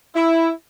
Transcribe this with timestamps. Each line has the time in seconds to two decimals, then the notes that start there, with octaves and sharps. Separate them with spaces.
0.16 E4